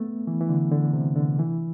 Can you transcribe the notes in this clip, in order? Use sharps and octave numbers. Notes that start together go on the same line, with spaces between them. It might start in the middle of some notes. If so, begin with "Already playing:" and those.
Already playing: A3 B3
E3
E3
D3
D3
C3
D3
E3